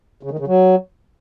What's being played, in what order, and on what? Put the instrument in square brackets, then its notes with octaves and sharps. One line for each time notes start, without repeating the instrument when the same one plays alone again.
[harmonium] C#3
D#3
C#3
F#3